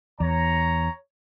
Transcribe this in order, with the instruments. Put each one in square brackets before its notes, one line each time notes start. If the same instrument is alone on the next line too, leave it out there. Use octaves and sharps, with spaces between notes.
[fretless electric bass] E2 [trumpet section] C#5 A#5